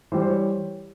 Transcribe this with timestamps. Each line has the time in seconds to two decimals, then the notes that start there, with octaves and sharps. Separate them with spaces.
0.12 E3 G3 C5
0.22 C5
0.30 C#5